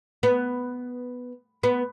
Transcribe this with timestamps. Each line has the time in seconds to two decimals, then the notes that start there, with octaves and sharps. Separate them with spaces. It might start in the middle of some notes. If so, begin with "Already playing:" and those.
0.23 B3
1.63 B3